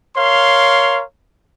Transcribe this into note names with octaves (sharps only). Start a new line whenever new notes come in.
A#4 C#5 F5 C6